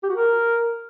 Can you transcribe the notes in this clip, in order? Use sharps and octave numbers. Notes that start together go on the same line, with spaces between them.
G4
F#4
A#4